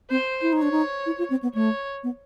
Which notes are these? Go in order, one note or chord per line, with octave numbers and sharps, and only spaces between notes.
C4 C5
E4
D#4
D4 C#5
D#4
E4
F4
C4
B3
A3 C#5
B3